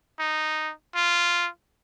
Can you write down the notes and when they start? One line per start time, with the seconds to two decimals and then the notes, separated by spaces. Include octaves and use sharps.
0.19 D#4
0.95 F4